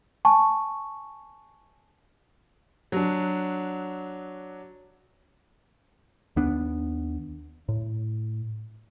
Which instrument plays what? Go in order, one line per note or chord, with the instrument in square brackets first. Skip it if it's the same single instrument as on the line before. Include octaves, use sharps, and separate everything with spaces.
[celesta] G#5 A5 C#6
[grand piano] F#3 D4
[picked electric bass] D#2 B3 D4
A2